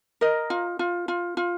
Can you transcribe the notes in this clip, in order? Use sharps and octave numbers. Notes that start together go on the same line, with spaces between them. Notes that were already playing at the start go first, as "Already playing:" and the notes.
A#4 D#5
F4
F4
F4
F4